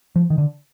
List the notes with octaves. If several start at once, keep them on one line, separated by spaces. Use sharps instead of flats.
F3
D#3
D3